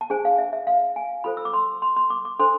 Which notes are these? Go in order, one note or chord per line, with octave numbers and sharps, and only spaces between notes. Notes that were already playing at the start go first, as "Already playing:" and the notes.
A5
D4 G#4 C5 G#5
F5
E5
E5
F5
G#5
F4 A4 C5 B5
E6
D6
C6
C6
C6
D6
D6
D4 A4 C5 C6